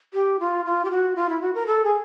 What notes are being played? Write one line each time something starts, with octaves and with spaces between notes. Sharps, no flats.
G4
F4
F4
G4
F#4
F4
E4
F#4
A#4
A4
G#4